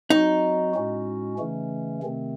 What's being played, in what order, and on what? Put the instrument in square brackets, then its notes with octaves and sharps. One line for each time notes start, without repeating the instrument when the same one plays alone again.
[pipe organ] F#3 C4 F#4 [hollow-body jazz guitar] D#4
[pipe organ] A2 G#3 C#4 F#4
C#3 E3 A3 C#4
C3 D#3 A3 C4